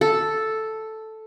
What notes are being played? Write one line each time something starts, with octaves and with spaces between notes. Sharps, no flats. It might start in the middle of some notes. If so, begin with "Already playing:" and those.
A4